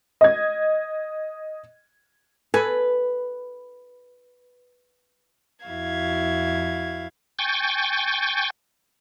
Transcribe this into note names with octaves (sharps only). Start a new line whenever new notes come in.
D#5 G#6
A4 B4 G#5
F2 E4 F#4 F5 G#6
G5 G#5 C#6 G6 A6